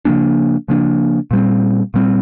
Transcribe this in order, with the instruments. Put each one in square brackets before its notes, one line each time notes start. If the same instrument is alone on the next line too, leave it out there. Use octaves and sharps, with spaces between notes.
[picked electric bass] C#3 F3 A#3 D4
C#3 F3 A#3 D4
A#2 G3 C4
A#2 G3 C4